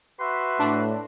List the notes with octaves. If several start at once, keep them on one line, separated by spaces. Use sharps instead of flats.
F#4 B4 E5 C6
A2 D4